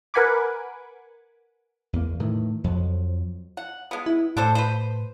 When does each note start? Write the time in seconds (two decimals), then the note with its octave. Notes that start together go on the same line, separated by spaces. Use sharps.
0.14 A#4 B4 F#5 G#5 B5 D6
1.93 E2 A#3
2.20 A2 D#3 E3
2.64 F2 F3 F#3
3.57 F#5
3.91 G#3 B3
4.06 E4
4.37 A2 D4 A4 C5
4.55 B4 C5